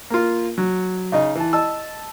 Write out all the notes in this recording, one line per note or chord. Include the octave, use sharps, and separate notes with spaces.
A#3 F4
F#3
C#3 D#4 D#5
E3 A5
D#5 A5 E6